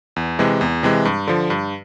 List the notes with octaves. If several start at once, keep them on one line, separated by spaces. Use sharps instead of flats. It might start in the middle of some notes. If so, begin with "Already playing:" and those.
E2
C3 E3 G#3
E2
C3 E3 G#3
G2
D3 F3
G2